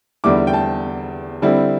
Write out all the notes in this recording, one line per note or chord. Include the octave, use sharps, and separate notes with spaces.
E2 D3 G3 E4 D6
G5
A5
D3 G3 C4 E4